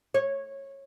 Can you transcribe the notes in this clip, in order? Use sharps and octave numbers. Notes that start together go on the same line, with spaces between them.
C#5